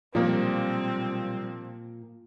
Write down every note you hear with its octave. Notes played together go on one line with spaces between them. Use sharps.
B1 A#2 F3 G3 A#3 C4 D5